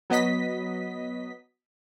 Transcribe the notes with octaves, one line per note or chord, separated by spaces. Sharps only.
F#3 B3 D#5 B6